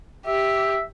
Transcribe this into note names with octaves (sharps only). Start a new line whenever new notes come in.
G4 E5